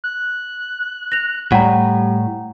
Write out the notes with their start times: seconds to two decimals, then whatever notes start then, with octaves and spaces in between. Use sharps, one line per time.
0.04 F#6
1.12 A#6 F7
1.52 A2 G3 F#5 G5 A#5